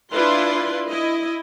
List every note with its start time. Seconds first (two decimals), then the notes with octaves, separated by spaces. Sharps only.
0.13 D4 E4 F4 B4 C6
0.89 E4 D#5